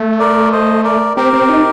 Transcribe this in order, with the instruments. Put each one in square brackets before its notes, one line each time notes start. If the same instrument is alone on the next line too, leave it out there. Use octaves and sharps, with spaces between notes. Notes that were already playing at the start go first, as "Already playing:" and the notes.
Already playing: [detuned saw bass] A3
[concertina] A#4 D5
C5 D#5
A#4 D5
[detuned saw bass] C4 [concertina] G4 A#4
[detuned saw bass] C4
D#4